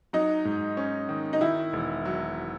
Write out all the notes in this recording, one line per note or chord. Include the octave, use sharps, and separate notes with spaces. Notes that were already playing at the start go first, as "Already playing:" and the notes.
F#3 D#4
G#2
C#4
D#3
D#4
D#3 E4
E1
F#3